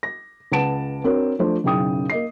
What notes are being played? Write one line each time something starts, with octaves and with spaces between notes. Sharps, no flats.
A#6
C#2 B4 F#5 A5 D7 E7
C4 D4 F#4 A#4 C#5
F3 A3 D4 C5
F#1 B1 C#3 G5 D#6
A#3 D#5 C7